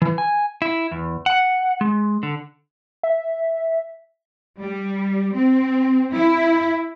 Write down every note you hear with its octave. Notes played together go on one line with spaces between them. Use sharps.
E3
G#5
E4
E2
F#5
G#3
D3
E5
G3
C4
E4